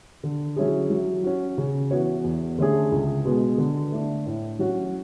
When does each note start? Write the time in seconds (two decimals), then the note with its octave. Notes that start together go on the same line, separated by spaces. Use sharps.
0.23 D3
0.56 F#3 C#4 E4 G#4
0.90 F#3
1.24 C#4 F#4
1.58 C#3
1.91 E3 B3 F#4 C#5
2.24 E2
2.58 D3 A3 C#4 G#4
2.92 C#2
3.25 B2 G#3 B3
3.58 D3
3.92 A3 D4
4.26 A2
4.59 F#3 C#4 F#4